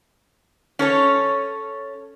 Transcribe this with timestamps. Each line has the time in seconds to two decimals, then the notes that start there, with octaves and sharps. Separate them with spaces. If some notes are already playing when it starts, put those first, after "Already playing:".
0.79 C#4 A4 C#5